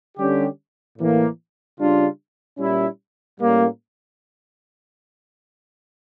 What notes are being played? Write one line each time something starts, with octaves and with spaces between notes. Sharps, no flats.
D3 G3 C#4 G4
A2 E3 A#3
C#3 G3 D4 F4
A#2 G3 C#4 E4
A2 G3 A#3 C#4